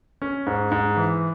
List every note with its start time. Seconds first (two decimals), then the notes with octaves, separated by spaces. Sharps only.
0.22 C#4
0.47 G#2
0.72 G#2
0.97 E3